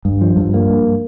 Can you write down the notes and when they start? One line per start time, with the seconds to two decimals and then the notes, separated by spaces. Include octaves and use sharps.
0.05 G2
0.21 F3
0.37 G2
0.54 A#3
0.70 G2